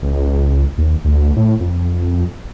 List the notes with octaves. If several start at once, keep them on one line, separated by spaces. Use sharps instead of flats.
C#2
D#2
D2
A2
F2